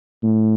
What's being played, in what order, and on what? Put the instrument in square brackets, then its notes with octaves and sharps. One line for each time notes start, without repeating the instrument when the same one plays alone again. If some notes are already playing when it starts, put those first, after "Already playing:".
[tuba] A2